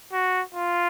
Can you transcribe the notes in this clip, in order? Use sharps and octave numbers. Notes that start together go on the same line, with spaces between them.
F#4
F4